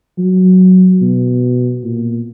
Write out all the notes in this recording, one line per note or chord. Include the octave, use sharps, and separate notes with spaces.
F#3
B2
A#2